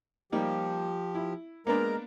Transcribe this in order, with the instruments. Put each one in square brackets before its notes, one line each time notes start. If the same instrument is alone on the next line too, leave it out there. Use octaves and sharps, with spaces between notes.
[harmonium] F3 G4 [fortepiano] G3 A#3 D#4
[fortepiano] E4
[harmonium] G#3 A#4 A#5 [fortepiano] A#3 B3 D4